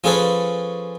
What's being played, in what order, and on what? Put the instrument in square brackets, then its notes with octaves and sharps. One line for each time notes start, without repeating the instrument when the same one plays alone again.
[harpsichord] F3 C#4 G#4 A4 B4 C#5